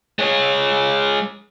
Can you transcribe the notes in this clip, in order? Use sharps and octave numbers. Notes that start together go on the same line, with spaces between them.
G#3 C#5